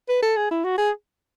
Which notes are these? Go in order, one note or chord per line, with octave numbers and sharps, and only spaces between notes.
B4
A4
G#4
E4
F#4
G#4